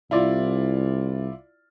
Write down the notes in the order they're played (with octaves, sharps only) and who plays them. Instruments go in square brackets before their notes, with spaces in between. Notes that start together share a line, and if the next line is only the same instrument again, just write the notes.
[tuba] C2 [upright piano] E4 F4 D5